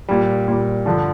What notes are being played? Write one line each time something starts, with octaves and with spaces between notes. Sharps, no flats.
A#2 G3
A#2 G3
G2 D3 F3